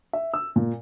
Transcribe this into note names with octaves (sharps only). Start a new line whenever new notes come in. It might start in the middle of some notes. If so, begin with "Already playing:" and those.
E5
E6
A#2